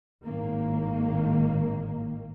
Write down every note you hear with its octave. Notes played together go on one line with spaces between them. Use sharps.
G#1 A2 D#3 A#3